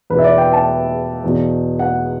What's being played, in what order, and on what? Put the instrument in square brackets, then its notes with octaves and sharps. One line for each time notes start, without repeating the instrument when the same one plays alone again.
[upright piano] E2 B2 B4
E5
D5
G5
A5
E2 B2
F#5